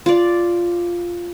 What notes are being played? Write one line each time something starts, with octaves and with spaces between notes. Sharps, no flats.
F4 D5